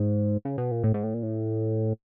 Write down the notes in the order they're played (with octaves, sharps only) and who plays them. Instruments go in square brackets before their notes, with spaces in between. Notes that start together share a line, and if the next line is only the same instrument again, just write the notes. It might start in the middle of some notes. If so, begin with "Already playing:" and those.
Already playing: [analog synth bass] G#2
C#3
B2
A#2
A2
G#2
A2
A#2
A2